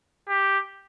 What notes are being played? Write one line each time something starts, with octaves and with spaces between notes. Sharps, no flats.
G4